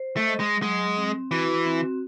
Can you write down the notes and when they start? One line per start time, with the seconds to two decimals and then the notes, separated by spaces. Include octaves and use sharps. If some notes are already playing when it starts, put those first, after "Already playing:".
Already playing: C5
0.17 A3
0.28 D#5
0.40 G#3
0.62 F#3 G#3
0.97 C4
1.31 E3 F#4
1.66 C4